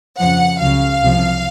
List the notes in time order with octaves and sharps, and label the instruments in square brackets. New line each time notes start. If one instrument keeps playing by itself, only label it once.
[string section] F2 C#3 F3 F#5
C#2 C#3 F#3 F5
C2 C3 F3